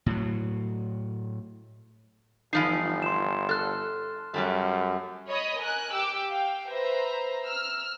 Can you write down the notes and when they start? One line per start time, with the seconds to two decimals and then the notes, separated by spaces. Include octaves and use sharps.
0.06 A2 F#3
2.53 G1 E3 F3 D#4 C7
3.02 C6 E7
3.49 A4 F6 F#6
4.34 F#2 F#3 G3 A3
5.28 C#5 D#5 B5 D#6
5.58 A#4 G#5 F#6
5.93 G4 D6 E6
6.29 F5 G5
6.70 B4 C5 E5 A#5
7.45 E6 F6